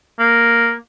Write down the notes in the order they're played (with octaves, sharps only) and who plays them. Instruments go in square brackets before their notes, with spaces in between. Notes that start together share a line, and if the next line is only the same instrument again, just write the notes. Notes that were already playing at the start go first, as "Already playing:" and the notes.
[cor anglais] A#3